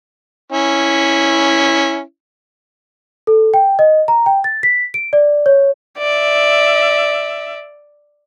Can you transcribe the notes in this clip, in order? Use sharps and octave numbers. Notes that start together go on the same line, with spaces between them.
C#4 E4
A4
G5
D#5
A#5
G5
A6
B6
D7
D5
C#5
D5 E5